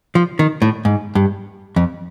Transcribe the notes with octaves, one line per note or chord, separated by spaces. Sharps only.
F3
D#3
A2
G#2
G2
F2